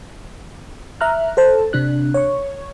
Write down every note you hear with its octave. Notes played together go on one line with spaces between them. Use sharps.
E5 A#5 F6 F#6
A4 C5 A5
C3 D4 F#6
C#5 C#6